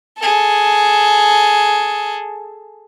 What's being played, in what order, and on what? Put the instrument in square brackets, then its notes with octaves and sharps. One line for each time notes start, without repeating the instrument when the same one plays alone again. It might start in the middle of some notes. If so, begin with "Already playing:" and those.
[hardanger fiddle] G#4 A4